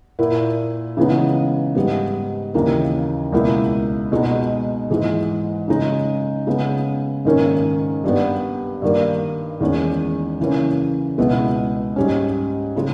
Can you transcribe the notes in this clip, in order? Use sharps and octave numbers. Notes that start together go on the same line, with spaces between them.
A#2 A#3 E4
C#3 E3 G#3 B3 D#4
G#2 G3 B3
D#2 C#3 E3 A#3 D#4
C#2 B2 A#3 E4
B2 G#3 D#4
G#2 E3 G#3
C#3 G#3 D#4
C#3 G#3 B3
G#2 D#3 A#3 C#4
G2 G3 B3
G2 D#3 A#3
E2 D#3 G#3 C#4
C#3 E3 A#3 C#4
C#2 B2 G#3 B3 E4
G#2 G3 C#4
C#3 G#3